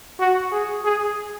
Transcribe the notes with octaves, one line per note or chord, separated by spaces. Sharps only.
F#4
G#4
G#4